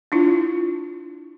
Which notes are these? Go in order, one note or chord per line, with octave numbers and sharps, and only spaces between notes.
D4 E4 F4